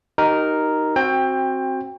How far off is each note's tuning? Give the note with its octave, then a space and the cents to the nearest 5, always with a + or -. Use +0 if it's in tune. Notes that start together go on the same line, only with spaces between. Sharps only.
D#4 +0 G4 -35 A#4 +0
C4 +15 F#4 +0 G5 +25